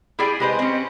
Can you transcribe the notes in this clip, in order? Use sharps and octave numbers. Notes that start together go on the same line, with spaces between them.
E4 G4 G#4 D5 G5
G#3 G4 B4 C5 D#5
C4 C#4